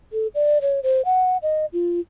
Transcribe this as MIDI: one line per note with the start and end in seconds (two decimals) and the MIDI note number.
0.13 0.27 69
0.35 0.58 74
0.62 0.80 73
0.83 1.02 72
1.05 1.37 78
1.42 1.66 75
1.73 2.00 65